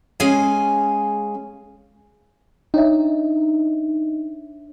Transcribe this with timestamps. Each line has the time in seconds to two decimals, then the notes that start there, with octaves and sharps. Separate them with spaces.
0.20 G#3 C#4 G#4 F5 G#5
2.74 D4 D#4 C#5 E5